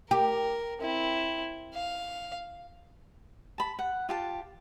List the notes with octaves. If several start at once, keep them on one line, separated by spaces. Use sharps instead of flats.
G4 A#4
C4 E4
F5
A5 B5
F#5
F4 G4 A5